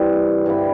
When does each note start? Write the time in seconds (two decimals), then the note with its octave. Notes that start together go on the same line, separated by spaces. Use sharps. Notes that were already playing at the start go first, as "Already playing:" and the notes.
Already playing: C3 E3 G3
0.46 G2 D3 G3 E4